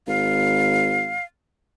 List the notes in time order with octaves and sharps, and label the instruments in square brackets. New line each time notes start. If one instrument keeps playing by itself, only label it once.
[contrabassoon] G#1 [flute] F5